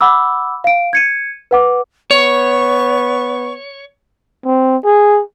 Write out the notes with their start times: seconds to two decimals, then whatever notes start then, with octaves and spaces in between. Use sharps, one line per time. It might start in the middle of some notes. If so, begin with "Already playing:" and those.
0.01 F#5 B5 D6 E6
0.64 F5 D7
0.93 G#6 C#7 D#7
1.51 B4 F#5 D6
2.11 B3 C#5 C#6
4.45 C4
4.85 G#4